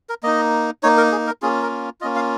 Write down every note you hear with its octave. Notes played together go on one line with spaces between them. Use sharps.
A#4
A#3 D#4 D#5
A#3 D#4 C#5
A#4
G#4
A#4
A#3 C#4 F4 G#4
A#4
A#3 C#4 F4 D#5
F5